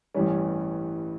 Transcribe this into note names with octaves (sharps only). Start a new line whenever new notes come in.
A1 G2 E3 G3 C#4